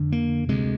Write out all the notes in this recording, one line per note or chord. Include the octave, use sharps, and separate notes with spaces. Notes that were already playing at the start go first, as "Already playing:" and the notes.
Already playing: F2 D3
A#3
D2 C3 G#3